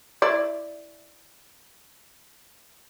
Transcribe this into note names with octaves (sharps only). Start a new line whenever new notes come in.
E4 D5